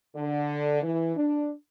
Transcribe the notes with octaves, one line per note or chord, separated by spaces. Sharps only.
D3
E3
D4